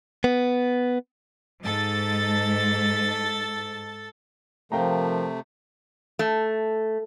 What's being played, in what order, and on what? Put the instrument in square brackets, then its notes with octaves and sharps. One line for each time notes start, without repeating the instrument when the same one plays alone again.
[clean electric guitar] B3
[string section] G#2 [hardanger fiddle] A4 A5
[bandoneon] C3 A3 [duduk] F3 [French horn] A#4 [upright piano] F5 G5 A#5
[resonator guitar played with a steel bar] A3